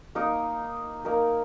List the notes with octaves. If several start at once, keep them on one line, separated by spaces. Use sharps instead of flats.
A#3 D#4 A#4
A#3 D#4 A#4